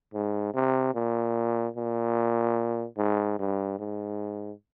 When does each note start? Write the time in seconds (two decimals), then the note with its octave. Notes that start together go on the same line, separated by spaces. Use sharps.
0.14 G#2
0.54 C3
0.94 A#2
1.76 A#2
2.97 G#2
3.39 G2
3.79 G#2